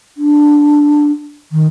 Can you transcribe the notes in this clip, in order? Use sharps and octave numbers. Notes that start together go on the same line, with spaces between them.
D4
D#3